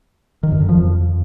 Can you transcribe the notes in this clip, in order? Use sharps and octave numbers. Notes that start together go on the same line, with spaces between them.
D#3
F#2
D3
F3
F2